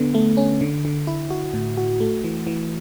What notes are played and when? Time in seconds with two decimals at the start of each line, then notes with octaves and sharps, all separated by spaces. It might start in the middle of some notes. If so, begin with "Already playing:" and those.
Already playing: D3 B3
0.14 A3
0.37 C#4
0.61 D3
0.85 D3
1.07 E4
1.30 F#4
1.54 A2
1.77 F#4
2.00 A3
2.24 E3
2.47 E3